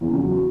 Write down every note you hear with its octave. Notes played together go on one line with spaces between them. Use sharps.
E2
C#3
F#3